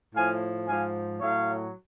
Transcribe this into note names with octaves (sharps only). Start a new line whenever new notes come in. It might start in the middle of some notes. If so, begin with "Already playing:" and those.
A2 F3 F5 G#5
G#2 F3 F5 G#5
A2 F#3 C#5 F5